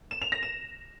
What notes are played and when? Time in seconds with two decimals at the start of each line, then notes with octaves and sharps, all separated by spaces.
0.11 E7
0.22 F7
0.32 A#6
0.43 E7